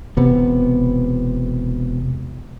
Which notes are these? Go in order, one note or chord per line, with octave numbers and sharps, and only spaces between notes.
E1 C3 B3